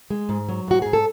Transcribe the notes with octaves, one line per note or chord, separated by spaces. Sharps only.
G#3
G#2
F#3
G#2 F#4
G#2 G#4
A4